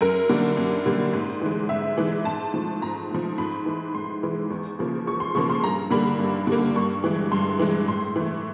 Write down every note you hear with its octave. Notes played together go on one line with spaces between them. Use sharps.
F#2 A#4
D3 G3 A#3
F#2
D3 G3 A#3
G#2
E3 G#3
G#2 E5
E3 G#3
G#2 A5
F3 A3
G#2 A#5
F3 A3
G#2 B5
E3 G#3
G#2 C6
E3 G#3
E2
C#3 F3 A#3
E2 C#6
C6
C#3 F3 A#3 C#6
C6
G2 A#5
D3 G3 A#3 B5
G2
D3 G3 A#3
G2 C#6
E3 G#3
G2 C6
E3 G#3
A2 C6
E3 A3